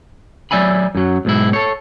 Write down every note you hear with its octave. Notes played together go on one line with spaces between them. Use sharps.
F#3 D5 E5 G#5 B5
F#2 F#3
B1 G#2 E4
A4 C#5